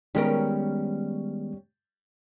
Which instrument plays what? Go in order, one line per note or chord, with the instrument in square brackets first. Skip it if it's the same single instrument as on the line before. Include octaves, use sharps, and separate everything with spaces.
[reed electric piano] D#3 G#3 B3 [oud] G3 C#4 A#4